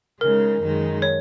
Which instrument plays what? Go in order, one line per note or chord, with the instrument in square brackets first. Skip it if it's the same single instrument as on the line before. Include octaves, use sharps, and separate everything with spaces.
[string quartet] C#3 G#3 D#4 [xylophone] A#4
[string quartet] F#2 D#3 G#3 D#4
[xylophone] C#5